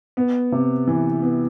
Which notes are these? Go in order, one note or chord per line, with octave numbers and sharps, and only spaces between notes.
B3
C3
E3
B3